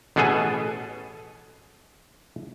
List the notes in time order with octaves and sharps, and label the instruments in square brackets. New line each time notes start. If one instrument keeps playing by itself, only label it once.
[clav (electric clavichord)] A1 B2 B3 G#4 A4 G#5